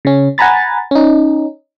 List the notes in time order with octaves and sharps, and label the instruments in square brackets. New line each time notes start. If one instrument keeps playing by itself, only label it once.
[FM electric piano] C#3 C#4
F#5 G#5 A#5 B5 A6
C#4 D#4